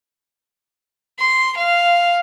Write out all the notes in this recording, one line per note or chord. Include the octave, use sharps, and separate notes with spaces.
C6
F5